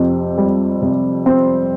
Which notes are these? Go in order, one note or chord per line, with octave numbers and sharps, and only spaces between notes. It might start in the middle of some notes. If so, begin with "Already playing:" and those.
Already playing: F2 C3 C4
G3
C3
C4